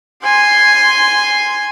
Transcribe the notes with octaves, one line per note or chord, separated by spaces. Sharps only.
G#5 C6